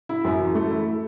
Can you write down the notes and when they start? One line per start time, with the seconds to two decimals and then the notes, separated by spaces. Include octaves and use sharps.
0.09 E4
0.24 F#2
0.39 E3
0.55 A3
0.71 E4